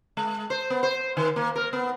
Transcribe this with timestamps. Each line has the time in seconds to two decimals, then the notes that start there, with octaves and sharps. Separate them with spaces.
0.17 G#3
0.50 C5
0.70 B3
0.83 C5
1.17 D#3
1.36 A#3
1.55 A#4
1.73 B3